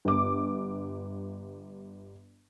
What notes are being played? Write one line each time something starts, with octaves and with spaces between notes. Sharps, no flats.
G1 D6